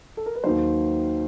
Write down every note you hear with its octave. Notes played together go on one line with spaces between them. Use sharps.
A4
A#4
B4
D#2 D#3 F#3 C5